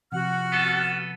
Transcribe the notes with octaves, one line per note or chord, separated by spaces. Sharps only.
C3 F3 F#4 F#5 F6
B3 A4